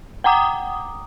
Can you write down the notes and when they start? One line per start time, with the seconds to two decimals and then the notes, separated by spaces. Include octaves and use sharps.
0.24 F#5 G5 A#5 D6 D#6